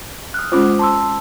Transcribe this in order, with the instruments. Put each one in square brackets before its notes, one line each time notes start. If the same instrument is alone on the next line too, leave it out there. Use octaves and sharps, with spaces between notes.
[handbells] D#6 F6 F#6
[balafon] G#3 C#4 F4 [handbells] C5 D6
[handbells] A5 C6 E6